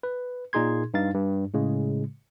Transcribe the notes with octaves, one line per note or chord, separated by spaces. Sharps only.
B4
A#2 D#4 G#4 C6 G#6
G2 D#4 F5 A6
G2
A2 C#3 G#3